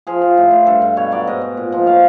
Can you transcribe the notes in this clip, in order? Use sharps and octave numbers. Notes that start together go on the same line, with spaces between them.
F3 G#4
F3
A2
A2
G2 A4
G2
B2 C#5
F#3 D5
G#2 D#5
G#2
A#2
F3
F#3 F5